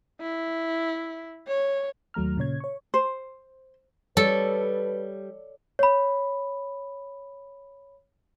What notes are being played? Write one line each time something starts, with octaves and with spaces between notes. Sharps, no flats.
E4
C#5
D#2 F#3 A3 A#5 F6
A#2 C#3 C#5 G#6
C#5 C#6
C5
G3 A4 B4 C#5
C#5 B5